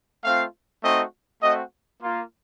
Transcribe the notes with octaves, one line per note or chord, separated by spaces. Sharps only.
A3 C4 F4 F5
A3 C4 D#4 F#4 D#5
A3 C4 F#4 D#5
A#3 F4